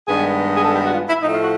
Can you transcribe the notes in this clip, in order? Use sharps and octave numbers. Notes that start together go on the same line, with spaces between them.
G2 D#3 G#3 B3 D4 G#4
G#4
A4
G4
F#4
F4
E4
A2 F3 A3 D#4
F4
F#4